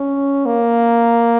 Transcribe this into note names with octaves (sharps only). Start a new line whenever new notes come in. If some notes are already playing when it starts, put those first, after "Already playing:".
Already playing: C#4
A#3